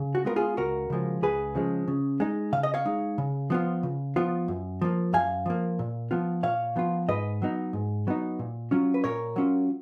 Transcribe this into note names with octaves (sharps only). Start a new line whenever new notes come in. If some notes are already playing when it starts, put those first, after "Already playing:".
Already playing: C#3
F#4
G#3 B3 F4 A#4
F4 G#4
C#2 F#4 A#4
C#3 F3 G#3
C#2 G#4 B4
C#3 F3 G#3
C#3
G#3 D#4
C#3 F5
D#5
C#5 F5
G#3 D#4
C#3
F3 B3 F4
C#3
F3 B3 F4
F#2
F3 A#3
F#2 F5 G#5
F3 A#3
A#2
F3 B3 F4
A#2 C#5 F5
F3 B3 F4
G#2 B4 D#5
F#3 B3 D#4
G#2
F#3 B3 D#4
A#2
F#3 C#4 F4
B4
A#2 A#4 C#5
F#3 C#4 F4